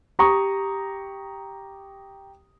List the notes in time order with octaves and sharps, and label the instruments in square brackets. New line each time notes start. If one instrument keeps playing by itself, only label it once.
[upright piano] G4 A#5 C#6 D#6